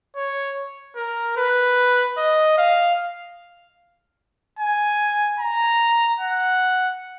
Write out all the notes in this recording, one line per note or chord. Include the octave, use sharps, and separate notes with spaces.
C#5
A#4
B4
D#5
F5
G#5
A#5
F#5